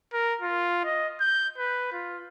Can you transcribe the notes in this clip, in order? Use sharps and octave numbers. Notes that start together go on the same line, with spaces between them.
A#4
F4
D#5
G6
B4
F4